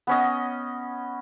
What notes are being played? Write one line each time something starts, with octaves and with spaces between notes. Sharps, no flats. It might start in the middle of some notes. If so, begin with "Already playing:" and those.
B3 C#4 D#5